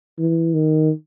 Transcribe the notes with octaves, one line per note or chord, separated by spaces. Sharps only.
E3
D#3